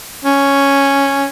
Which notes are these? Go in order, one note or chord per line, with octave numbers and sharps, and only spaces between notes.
C#4